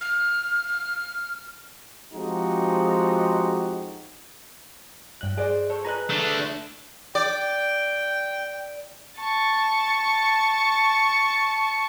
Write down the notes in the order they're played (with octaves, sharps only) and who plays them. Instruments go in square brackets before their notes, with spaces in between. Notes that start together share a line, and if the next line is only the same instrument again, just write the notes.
[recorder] F6
[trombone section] F3 G#3 C4 D#4 F#4 G4
[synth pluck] G2 F#6 [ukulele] D#5 G5
[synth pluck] G#4 [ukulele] C5 D5 D#5
[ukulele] A4 C5 C#5
[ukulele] G#4 B4 D#5 [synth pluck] A#5 F#6
[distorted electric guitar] A3 D4 [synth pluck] E7
[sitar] D5 [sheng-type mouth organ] G5
[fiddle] A5 C#6